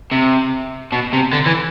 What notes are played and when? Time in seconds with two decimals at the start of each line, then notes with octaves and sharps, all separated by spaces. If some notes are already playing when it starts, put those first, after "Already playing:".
0.12 C3
0.92 B2
1.13 C3
1.33 D3
1.46 E3